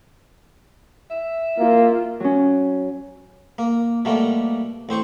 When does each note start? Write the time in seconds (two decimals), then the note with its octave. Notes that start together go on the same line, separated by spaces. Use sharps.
1.11 E5
1.59 A#3 F4
2.20 F#3 C#4
3.58 A#3
4.05 B2 G3 A3 A#3
4.89 A1 C4 C5 C#6